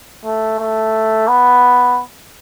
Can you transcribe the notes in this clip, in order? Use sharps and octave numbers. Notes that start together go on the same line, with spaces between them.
A3
A3
B3